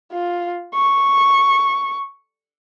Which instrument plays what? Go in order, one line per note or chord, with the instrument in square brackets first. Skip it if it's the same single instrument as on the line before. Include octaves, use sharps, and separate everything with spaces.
[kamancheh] F4
C#6